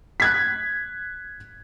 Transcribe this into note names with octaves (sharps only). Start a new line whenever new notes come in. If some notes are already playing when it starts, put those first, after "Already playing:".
F#6 G#6 B6